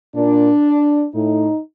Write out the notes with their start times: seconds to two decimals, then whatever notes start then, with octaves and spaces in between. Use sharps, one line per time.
0.15 A#2 D4
1.14 A2 D#4